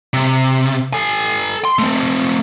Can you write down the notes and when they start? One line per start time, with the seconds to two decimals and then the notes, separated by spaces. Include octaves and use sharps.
0.13 C3
0.93 A4 G#5
1.65 C6
1.79 A3 C4